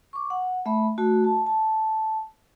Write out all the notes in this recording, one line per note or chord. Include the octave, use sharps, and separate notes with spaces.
C#6 D6
F#5
A3 E5 B5
A3 F#4
A5
A5